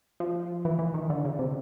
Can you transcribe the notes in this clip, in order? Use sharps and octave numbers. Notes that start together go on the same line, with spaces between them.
F3
E3
E3
D#3
D3
C#3
C3